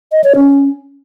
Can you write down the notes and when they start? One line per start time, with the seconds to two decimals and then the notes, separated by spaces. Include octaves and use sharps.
0.12 D#5
0.24 C#5
0.36 C#4